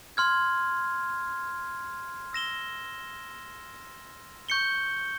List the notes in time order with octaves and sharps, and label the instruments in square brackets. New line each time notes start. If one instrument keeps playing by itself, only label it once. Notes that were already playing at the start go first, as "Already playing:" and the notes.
[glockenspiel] C6 F6 G#6
E6 A#6 E7 G7
C#6 G6 C#7 G7